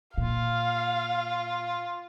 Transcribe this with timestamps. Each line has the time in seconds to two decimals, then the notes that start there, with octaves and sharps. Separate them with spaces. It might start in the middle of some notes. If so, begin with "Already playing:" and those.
0.18 A#2 F4 F5